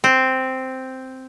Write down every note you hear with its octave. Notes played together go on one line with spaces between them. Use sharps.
C4